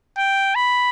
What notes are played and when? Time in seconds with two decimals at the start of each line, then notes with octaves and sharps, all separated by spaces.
0.18 G5
0.55 B5